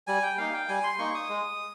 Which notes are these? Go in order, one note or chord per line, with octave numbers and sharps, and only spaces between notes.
G3 G#5
G5
A#3 D#4 F5
G5
G3 G#5
C6
A#3 D#4 C#6
D#6
G#3